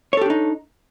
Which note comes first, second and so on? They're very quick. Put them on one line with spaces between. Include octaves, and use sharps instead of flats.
C#5 A4 G4 D4 D#4